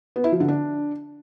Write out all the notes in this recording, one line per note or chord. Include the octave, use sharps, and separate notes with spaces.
B3
E4
F3
D3
D4